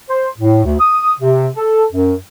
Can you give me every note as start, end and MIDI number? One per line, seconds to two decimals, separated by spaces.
0.10 0.29 72
0.39 0.64 45
0.65 0.76 38
0.80 1.13 87
1.20 1.48 48
1.57 1.84 69
1.93 2.15 42